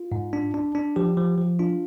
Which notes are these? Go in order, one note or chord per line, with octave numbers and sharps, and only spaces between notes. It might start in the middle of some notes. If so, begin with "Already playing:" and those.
Already playing: F4
G#2
D4
D4
D4
F3 G4
F3
F3
D4 F4